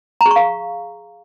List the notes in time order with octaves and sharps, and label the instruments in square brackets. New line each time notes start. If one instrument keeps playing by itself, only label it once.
[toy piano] A#5
G#4
C#6
F5